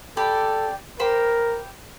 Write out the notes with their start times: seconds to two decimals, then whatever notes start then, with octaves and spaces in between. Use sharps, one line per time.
0.17 G4 A4 D5 B5
1.00 G4 A#4 C5 B5